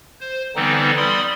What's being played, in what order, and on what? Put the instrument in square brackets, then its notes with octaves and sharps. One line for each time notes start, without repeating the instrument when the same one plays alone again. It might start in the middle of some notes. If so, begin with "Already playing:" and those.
[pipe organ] C5
D3 E3 G3 B3 C4 D#4
G3 D5 B5 C6 D#6